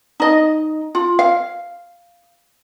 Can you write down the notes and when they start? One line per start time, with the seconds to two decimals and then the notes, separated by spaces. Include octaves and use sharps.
0.20 D#4 D#5
0.95 F4
1.19 F5